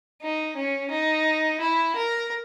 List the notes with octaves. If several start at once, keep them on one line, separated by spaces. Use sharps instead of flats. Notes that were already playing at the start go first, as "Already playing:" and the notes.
D#4
C#4
D#4
E4
A#4